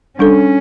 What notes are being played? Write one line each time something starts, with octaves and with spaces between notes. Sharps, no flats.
G3 C#4 D4 A4